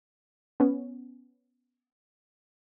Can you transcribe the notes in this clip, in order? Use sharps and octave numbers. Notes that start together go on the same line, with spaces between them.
B3 C#4